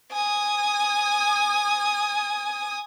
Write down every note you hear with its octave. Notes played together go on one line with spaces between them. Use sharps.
G#5 D#6